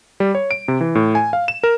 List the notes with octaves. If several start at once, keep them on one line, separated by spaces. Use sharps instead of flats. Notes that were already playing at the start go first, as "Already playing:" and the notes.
G3
C#5
D7
C3
E3
A2
G#5
F5
E7
A#4